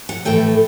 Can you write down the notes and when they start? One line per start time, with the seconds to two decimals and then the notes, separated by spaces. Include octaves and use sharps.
0.09 F#5
0.25 A2 E3 A3 G5